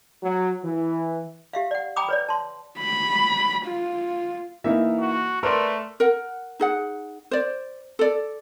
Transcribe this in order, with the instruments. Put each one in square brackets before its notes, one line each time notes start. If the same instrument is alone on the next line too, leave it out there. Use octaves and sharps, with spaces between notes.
[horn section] F#3
E3
[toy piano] G4 E5 F5
D5 F#5
G5 G#5 A#5 B5 D6 D#6
B4 C#5 D5
A5 C6
[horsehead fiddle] B5
F4
[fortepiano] E3 A#3 D#4 [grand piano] E5
[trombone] F#4
[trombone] A3 [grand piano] A#4 B4 D5 [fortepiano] C6
[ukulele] A#4 F#5
D#4 G#4 F#5
C5 D5
A4 D5